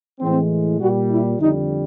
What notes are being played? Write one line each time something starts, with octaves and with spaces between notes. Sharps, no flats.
A2 E3 G#3 C4
A#2 G3 F#4
E4
F2 D3 G3 D#4